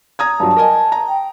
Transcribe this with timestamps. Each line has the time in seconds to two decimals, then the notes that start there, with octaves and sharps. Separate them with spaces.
0.19 A#5 D#6 G#6
0.40 G2 F#3 A5
0.56 A#4 D#5 G#5
0.92 A#5
1.09 G5